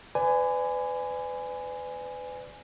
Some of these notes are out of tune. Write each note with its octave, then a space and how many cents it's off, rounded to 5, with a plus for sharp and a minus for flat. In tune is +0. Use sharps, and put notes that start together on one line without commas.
B4 +35 D5 +0 G#5 +0